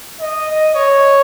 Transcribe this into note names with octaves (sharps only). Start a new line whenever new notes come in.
D#5
C#5